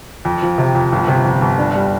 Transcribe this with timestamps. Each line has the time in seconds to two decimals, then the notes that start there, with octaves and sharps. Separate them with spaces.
0.25 F2
0.42 F3
0.58 C3
0.75 F2
0.92 G1
1.08 C3
1.25 F2
1.42 G1
1.59 D4
1.75 G3